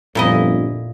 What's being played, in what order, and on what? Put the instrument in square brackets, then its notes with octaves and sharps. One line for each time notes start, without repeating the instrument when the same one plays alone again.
[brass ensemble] G1 F2 [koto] A#2 E4 D#5